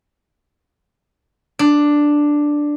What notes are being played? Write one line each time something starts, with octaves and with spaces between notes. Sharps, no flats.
D4